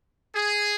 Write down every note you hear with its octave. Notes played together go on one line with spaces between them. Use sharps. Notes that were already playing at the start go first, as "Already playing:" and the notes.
G#4